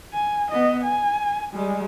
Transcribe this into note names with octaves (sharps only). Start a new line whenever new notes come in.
G#5
B3 D#5
G#5
G3 G#3